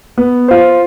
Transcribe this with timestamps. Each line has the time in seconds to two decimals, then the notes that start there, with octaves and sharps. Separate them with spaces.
0.18 B3
0.48 F4 C5